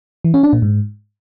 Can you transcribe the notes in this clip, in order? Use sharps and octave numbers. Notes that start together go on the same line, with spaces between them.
E3
C#4
D4
A#2
G#2